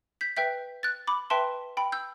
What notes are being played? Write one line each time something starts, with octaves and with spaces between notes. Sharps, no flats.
G6 B6
B4 E5 G5 G6 B6
F#6 A6
B5 D6
B4 E5 G5 A5 C6
G5 B5
E6 G6